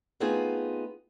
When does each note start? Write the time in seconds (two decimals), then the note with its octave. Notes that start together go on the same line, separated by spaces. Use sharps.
0.20 A3 B3 C4 D#4 F4 G#4